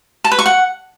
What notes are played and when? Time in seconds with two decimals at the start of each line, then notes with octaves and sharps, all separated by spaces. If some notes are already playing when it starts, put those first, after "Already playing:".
0.24 A5
0.32 B4
0.39 C#6
0.46 F#5